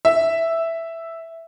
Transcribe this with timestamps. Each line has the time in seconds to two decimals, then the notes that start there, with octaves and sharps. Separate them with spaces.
0.05 E5